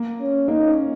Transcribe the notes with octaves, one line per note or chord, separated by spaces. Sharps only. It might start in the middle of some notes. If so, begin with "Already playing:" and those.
Already playing: A#3
C#4
A#3 D#4
C#4